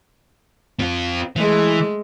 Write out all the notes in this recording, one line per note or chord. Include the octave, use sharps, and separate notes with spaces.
C4 F4
E3 G#3 A3